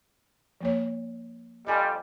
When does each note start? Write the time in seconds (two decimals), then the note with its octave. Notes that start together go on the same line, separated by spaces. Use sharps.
0.61 F3 A#3 C#5
1.67 F2 G3 D#5 G#5